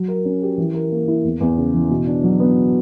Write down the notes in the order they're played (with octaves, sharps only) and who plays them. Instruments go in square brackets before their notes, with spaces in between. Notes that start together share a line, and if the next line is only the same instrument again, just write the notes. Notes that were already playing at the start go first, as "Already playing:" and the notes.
Already playing: [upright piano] F#3
A#4
C#4
G4
E3
A#4
A#3
E4
E2
E2
C#3
E3
B2
D4
F#3
B3